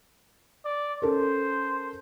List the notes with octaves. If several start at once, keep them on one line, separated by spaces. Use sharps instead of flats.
D5
C#4 A4 A#4 C5